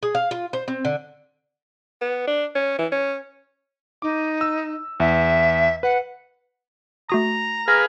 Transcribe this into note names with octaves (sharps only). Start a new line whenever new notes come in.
G#4
F5
F4
C5
C4
D3
B3
D4
C#4
E3
C#4
D#4 D6
E6
E2 E5
B4 F#5
A3 F#4 A#5 D#6
G#4 A#4 B4 F5